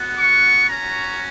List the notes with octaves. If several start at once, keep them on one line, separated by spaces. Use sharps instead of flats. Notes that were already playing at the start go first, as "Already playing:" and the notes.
Already playing: B3 F#4
C#6
C#4 F#4 A#5